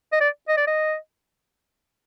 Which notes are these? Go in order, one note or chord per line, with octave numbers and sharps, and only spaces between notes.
D#5
D5
D#5
D5
D#5